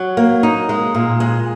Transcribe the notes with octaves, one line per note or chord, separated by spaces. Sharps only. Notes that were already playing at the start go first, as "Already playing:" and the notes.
Already playing: F#3
A#3
D#4
G#3
A#2
G#3